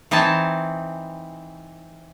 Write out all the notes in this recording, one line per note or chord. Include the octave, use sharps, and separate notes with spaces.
E3 C4 D#4 G#5 A5